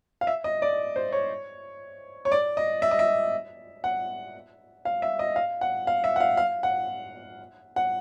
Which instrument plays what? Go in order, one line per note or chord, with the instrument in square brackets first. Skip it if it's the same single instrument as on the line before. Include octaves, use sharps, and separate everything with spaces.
[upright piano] F5
E5
D#5
D5
C5
C#5
C#5
D5
D#5
E5
D#5
E5
F#5
F5
E5
D#5
F5
F#5
F5
E5
F#5
F5
F5
F#5
F#5